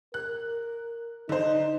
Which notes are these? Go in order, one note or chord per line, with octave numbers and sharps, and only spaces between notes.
A#4 F#6
D3 D#4 C5